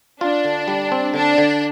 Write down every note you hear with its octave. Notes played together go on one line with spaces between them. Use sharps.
D4 F4
D3
G3
C4
D3 D4
D3